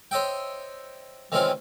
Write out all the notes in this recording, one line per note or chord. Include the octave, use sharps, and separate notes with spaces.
C5 C#5 D#5 E5 G5
D#3 E3 G#3 C4 C#4 F4